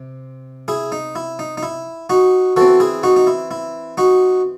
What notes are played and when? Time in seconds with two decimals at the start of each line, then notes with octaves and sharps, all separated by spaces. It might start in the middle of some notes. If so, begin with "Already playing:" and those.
Already playing: C3
0.68 E4 G#4
0.92 D#4
1.16 E4
1.39 D#4
1.57 D#4
1.63 E4
2.10 D#4 F#4
2.56 E3 C4 F#4 A4
2.80 E4 G#4
3.03 D#4 F#4
3.16 D#4
3.27 E4
3.51 E4
3.97 D#4 F#4